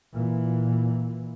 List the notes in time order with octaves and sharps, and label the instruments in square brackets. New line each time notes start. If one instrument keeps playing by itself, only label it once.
[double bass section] A#2 E3